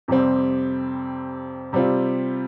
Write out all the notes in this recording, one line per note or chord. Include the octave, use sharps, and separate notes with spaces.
F2 C3 G3 C4
C3 G3 C4 F4